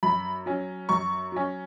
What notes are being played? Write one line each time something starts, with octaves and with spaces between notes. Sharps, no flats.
F#2 B5
F#3 C#4
F#2 C#6
F#3 C#4